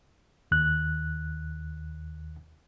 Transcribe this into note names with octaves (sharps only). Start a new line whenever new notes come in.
D#2 F#6